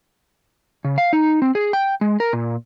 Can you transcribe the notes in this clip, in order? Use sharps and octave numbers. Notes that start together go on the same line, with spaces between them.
C#3
F5
D#4
C4
G#4
G5
G#3
A#4
A#2